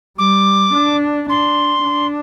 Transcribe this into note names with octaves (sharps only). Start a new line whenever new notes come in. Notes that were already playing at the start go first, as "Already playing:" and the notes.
G3 D6
D4
D4 C6
D4